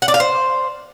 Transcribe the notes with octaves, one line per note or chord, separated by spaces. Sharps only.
F#5
D5
F5
C5